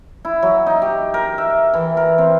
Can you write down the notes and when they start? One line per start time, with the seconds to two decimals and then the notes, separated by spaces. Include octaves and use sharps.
0.25 E4
0.42 F#3
0.66 D#4
0.82 G4
1.14 A#4
1.38 E5
1.74 E3
1.97 A#4
2.18 C4